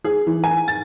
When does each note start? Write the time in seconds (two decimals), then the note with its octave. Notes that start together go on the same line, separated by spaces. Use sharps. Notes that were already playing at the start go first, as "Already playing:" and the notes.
0.04 G#4
0.27 E3
0.44 G#5
0.68 A6